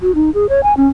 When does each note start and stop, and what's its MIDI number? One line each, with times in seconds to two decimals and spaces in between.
0.01 0.14 66
0.15 0.30 63
0.34 0.46 68
0.49 0.60 73
0.63 0.74 80
0.77 0.87 61